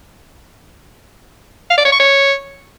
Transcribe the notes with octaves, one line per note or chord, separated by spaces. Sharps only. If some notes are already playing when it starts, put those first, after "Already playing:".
F5
D5
C#5
C#6
C#5